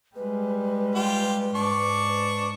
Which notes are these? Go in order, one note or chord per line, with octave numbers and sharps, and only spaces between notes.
G3 G#3 B4
F4 G4
G#2 D4 C#6 D6
B4